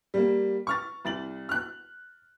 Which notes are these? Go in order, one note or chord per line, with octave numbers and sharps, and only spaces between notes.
G3 A#3
C#6 F6 A6
C2 A6 F#7
F6 F#6